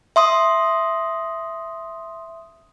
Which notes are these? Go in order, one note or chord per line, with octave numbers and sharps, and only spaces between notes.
E5 C6 D#6